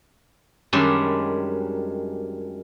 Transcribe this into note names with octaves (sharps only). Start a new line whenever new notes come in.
F#2 D#3 G3 G#3 D4